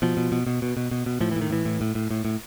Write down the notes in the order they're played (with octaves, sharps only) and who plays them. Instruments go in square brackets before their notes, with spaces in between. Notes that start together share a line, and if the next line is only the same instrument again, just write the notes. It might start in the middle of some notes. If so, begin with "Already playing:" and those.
[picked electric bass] B2 F3
B2
B2
B2
B2
B2
B2
B2
A2 F3
E3
A2
D#3
A2 E3
A2
A2
A2
A2
A2